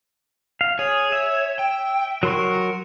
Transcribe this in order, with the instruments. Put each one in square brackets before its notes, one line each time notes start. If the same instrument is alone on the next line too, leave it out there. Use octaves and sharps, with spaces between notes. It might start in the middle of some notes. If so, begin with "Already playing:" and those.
[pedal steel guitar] F5
[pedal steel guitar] G#4 [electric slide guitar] C#5
[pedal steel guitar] E5
[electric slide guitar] G5
[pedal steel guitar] F#3 C6 C#6 [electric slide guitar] A#4